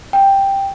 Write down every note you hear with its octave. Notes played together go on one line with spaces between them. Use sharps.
G5